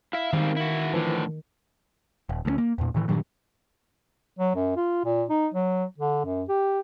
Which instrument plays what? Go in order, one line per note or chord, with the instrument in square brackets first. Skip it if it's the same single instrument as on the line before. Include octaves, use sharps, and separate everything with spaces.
[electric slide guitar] E4 E5 [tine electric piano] F5
[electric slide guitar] G#2 G3 C4 [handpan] D#3
[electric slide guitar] E4 F#4
[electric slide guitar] A2 D3 [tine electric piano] E3 F3
[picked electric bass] D#1
D2 G#3 C#4
A#3
E2 A#2
A2 D#3 E3
G2 A#2 D#3 F#3
[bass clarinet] F#3
F#2
F4
A#2
D#4
F#3
D3
F#2
G4